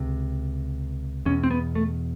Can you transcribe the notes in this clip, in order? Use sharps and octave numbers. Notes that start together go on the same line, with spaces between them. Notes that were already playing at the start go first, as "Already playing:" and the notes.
Already playing: C#2 C3
E2 B2 C#4
C4
B3
A3